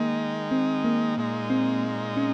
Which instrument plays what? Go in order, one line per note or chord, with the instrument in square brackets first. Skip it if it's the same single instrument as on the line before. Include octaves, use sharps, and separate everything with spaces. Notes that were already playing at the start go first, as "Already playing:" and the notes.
Already playing: [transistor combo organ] D#3 G#3 D#4 [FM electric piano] A#3
[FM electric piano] C4
A#3
[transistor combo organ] A#2 G#3 D#4
[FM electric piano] C4
C#4